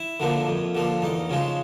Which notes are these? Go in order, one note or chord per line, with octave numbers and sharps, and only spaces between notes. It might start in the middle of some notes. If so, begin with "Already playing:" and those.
Already playing: E4
D3 F3 A#3
F2
D3 F3 A#3
E2 D#4
C#3 F3 G#3